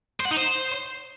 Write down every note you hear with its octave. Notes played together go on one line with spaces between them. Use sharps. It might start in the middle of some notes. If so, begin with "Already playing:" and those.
C5
F#5
D#4
C5